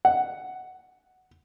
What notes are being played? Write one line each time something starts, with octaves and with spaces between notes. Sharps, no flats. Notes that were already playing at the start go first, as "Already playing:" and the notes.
F#5